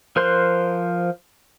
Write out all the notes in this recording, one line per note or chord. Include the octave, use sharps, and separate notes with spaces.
F3 A#4 C5 C6 F#6